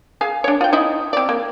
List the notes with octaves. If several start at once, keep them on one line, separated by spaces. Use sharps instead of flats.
G#4 F5 G#5
D4 C#5
F4 G5
D#4 E4 D#5
C4 D5
A#3